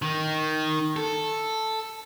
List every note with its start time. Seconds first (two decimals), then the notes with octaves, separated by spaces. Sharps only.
0.02 D#3
0.96 A4